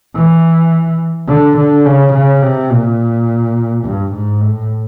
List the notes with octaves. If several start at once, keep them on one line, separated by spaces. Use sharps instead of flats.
E3
D3
D3
C#3
C#3
C3
A#2
G2
G#2
A2